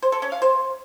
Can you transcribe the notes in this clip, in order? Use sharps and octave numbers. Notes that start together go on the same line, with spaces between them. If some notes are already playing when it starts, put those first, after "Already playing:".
C5
A4
C#4
F5
C5